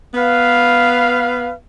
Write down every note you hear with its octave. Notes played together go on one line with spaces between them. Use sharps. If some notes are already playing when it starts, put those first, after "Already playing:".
B3 B4 F5